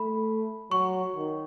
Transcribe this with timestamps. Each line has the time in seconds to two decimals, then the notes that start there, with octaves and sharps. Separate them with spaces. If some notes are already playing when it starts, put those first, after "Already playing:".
Already playing: A3 B5
0.71 F#3 C#6
1.16 D#3